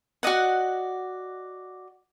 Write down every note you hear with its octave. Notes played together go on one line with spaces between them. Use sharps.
F#4 D5 D#5 F#5